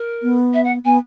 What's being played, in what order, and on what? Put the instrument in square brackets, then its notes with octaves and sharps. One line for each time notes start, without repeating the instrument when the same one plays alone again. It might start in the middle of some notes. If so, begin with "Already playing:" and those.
Already playing: [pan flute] A#4
[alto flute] B3
[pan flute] E5
F#5
[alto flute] B3 [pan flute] G#5